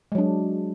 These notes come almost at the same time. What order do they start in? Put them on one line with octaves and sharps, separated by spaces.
G#3 F#3 D4